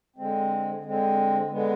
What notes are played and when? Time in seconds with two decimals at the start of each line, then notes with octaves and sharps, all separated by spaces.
0.16 D3 G#3 C4
0.83 D3 G#3 C4
1.50 D3 G#3 B3